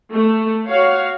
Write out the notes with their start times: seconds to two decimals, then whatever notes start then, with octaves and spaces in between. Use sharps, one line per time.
0.14 A3
0.69 F#4 C#5 F5